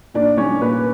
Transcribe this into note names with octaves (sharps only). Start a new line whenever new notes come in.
A#2 D4 D5
G3 C#4 C#5
A#2 B4